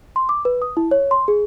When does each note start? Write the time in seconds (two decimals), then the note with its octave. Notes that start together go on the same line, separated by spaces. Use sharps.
0.16 C6
0.29 D6
0.45 B4
0.62 D#6
0.77 E4
0.91 C#5
1.11 C6
1.28 G#4